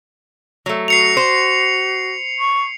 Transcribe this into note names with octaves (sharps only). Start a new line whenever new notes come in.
F#3 A3
F#4 C7 C#7 F7
C5
C#6